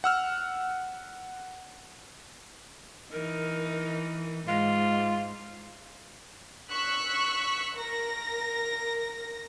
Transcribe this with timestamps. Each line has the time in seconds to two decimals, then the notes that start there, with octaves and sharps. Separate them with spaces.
0.04 F#5 E6 F6
3.12 E3 D#4 A#4
4.48 G#2 G#3 F4
6.70 C#6 E6 F#6 B6
7.77 A#4 A#6